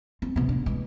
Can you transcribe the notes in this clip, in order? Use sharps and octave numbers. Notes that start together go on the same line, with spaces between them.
C4
C3 B3
B3 D4
E3 G#3